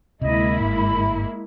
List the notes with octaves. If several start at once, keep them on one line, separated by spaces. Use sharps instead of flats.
D2 C3 G#3 A#3 E4 D#5
G1 G#2 B5